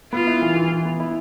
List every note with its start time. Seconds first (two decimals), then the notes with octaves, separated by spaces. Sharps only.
0.13 B3 F4
0.27 E4
0.42 E3
0.56 E3
0.71 E3
0.85 B3
1.00 E4